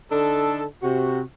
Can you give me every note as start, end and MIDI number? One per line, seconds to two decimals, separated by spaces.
0.11 0.64 50
0.11 0.64 62
0.11 0.64 63
0.11 0.64 69
0.83 1.21 48
0.83 1.21 66